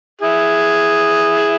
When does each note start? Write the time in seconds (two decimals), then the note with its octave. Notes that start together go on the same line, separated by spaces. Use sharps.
0.21 E4 G#4